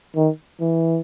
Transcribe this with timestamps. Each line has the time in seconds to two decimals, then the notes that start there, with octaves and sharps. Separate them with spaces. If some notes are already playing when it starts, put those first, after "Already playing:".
0.16 D#3
0.61 E3